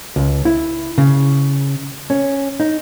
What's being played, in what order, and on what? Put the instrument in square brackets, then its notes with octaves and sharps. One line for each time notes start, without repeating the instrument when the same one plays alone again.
[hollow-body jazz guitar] C#2
E4
C#3
C#4
D#4